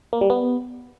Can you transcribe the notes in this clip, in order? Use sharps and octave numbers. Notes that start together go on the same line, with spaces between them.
A#3
G3
B3